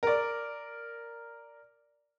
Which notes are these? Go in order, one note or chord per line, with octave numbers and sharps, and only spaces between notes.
A#4 D5